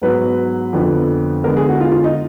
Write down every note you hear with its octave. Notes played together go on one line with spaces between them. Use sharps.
G#2 F#3 B3 B4
F2 D3 F3 B3
D3 G#3 B3 A#4
G#4
F#4
F4
F4
D#4